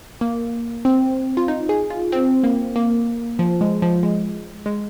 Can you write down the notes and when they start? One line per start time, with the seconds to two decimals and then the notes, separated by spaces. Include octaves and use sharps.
0.21 A#3
0.85 C4
1.37 F4
1.48 D#4
1.69 G#4
1.90 F4
2.12 C4
2.44 A#3
2.76 A#3
3.39 F3
3.61 G#3
3.82 F3
4.03 G#3
4.66 G#3